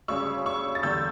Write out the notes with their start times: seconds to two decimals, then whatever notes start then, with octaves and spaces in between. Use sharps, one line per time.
0.08 D2 C#3 G3 C#4 C#6 E6
0.46 C#6 E6
0.75 A6
0.83 E2 D3 G3 E6 G6